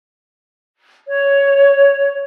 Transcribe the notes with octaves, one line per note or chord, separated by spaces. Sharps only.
C#5